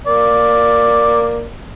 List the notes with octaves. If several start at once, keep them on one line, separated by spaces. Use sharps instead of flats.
A#3 D5